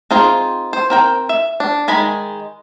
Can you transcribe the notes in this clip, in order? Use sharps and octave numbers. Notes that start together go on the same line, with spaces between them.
C4 D#4 F4 G#4
C5
C4 A#4 G5
E5
D4
D#3 G#3 G#5 B5